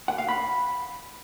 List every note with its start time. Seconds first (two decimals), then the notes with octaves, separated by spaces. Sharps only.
0.08 F#5
0.18 F5
0.29 B5